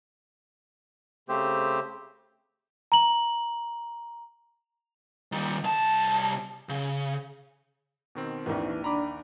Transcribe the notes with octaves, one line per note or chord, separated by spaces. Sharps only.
C#3 A3 C4 G4 C5
A#5 F#7
D#3 G3
C2 A5
C#3
B2 D#3 C4
A#1 D#2 E3
D4 A#5 B5 D6